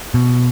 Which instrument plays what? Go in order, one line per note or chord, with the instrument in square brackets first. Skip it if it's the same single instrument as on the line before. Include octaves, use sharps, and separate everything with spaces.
[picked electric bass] B2